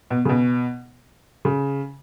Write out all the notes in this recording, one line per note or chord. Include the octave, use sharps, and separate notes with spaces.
B2
C#3
B2
C#3